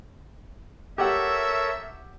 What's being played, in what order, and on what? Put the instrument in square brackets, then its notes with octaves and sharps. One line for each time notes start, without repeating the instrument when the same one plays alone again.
[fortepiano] G4 F#5 [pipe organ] A4 A#4 C#5 [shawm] E5